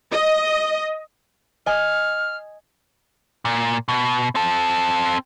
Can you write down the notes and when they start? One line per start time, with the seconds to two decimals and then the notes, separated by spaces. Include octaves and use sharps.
0.12 D#5
1.66 D#5 G#5 F6
3.45 A#2
3.88 B2
4.35 C4 A4